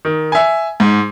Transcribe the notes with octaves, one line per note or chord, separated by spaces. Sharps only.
D#3
E5 G#5
G#2